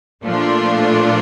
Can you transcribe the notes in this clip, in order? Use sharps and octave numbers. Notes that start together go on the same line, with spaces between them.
A#2 F3 A3 D4 F4